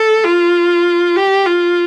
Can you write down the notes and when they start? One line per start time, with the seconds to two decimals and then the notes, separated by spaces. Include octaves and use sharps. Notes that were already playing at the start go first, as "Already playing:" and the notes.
Already playing: A4
0.24 F4
1.16 G4
1.46 F4